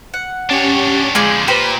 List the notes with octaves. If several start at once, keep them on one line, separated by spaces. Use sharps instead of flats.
F#5
C#4 D4 G4 C#5 A6
F2 D3 G#3 F4 G#4 D5 G6
A#2 G4 B4 C5 B5